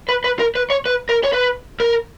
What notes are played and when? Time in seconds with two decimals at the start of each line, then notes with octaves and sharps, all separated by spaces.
0.09 B4
0.24 B4
0.39 A#4
0.55 B4
0.70 C#5
0.86 B4
1.09 A#4
1.24 C#5
1.33 B4
1.80 A#4